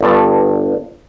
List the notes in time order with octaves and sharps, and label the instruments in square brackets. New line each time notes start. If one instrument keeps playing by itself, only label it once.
[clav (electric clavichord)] G1 G2 A5